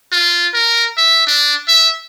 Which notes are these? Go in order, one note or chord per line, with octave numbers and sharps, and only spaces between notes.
F4
A#4
E5
D4
E5